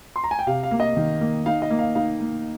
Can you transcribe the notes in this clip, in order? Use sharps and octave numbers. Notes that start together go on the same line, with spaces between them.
C6
A#5
G#5
G5
C3 F5
F5
A#3
D#5
D#3
A#3
D#4 F5
D#5
A#3
F5
D#4 F5
A#3